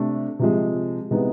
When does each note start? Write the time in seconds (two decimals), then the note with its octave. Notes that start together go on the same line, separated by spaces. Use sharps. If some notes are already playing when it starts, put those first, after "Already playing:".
Already playing: C3 A3 D4
0.39 C3 F3 G#3
1.11 C3 E3 G#3 B3 D#4